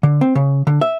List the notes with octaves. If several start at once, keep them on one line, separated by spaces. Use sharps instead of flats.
D3
C4
C#3
D3
E5